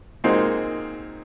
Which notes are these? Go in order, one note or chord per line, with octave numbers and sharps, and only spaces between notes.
A#2 G#3 A#3 C4 D#4 F#4